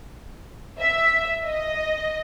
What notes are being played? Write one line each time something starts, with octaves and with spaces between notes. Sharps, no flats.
E5
D#5